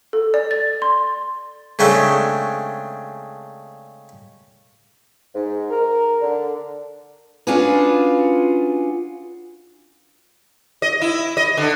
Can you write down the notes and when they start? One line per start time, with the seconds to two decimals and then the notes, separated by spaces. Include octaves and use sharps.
0.13 A4
0.34 D5
0.51 A6
0.82 C6
1.79 C#3 G#3 A3 C4 D4
5.35 G#2
5.70 A#4
6.22 D3
7.47 C#4 D4 F4 F#4 G#4 B4
10.82 D#5
11.02 E4
11.37 D#5
11.57 D3